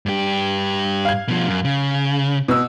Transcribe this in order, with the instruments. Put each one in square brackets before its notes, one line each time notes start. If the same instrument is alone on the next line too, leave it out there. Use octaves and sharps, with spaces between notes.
[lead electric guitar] G2 G4
[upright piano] F5 G#6
[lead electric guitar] B2 F3
F#2
C#3
[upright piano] B2 E6